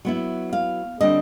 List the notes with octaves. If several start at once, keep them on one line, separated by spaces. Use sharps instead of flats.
F#3 B3 E4
F5
D3 G3 C4 D#5